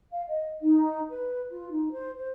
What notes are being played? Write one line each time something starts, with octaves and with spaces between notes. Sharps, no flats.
F5
D#5
D#4
B4
F4
D#4
C5
C5